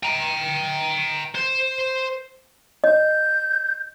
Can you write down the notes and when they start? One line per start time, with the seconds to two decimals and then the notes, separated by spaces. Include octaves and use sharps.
0.03 G5 A#5
1.35 C5
2.84 D#5 G6